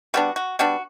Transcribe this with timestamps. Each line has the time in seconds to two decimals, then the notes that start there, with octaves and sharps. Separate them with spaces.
0.14 G3 B3 D4 F#4
0.36 F#4
0.59 G3 B3 D4 F#4